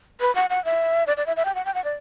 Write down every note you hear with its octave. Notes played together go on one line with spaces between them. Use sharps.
B4
F#5
F#5
E5
D5
D5
E5
E5
G5
F#5
G5
F#5
D5